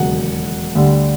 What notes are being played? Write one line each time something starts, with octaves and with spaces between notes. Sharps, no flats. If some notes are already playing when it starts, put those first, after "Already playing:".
Already playing: E1 D#2 C#3 F#3 F#5
D2 D3 G3